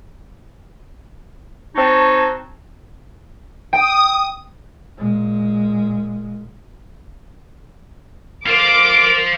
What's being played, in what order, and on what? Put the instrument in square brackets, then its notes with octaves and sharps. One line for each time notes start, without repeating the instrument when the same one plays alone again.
[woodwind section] C4 D#4 F#4 C#5 G#5 A5
[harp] G5 [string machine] D#6
[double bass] A#2 G#3
[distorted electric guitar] F4 C5 [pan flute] A#4 [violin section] D6